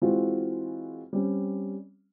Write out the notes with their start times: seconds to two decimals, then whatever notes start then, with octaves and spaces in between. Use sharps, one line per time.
0.02 E3 G#3 C4 F4 F#4
1.13 G3 C4 C#4